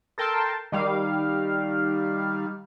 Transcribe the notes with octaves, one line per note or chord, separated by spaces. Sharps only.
A4 A#4 G5 A5 C6
D#3 G3 F5